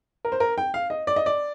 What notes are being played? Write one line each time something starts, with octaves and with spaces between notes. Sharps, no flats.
A#4
C5
A#4
G5
F5
D#5
D5
D#5
D5